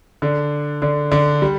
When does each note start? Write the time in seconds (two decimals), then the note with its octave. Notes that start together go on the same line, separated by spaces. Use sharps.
0.22 D3 D4
0.82 D3 D4
1.12 D3 D4
1.42 G3